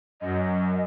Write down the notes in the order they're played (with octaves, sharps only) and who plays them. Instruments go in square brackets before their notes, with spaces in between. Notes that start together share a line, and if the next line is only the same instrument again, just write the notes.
[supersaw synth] F#2 [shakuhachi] D#5